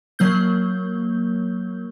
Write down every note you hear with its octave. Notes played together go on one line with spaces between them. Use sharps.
F#3 A#3 G6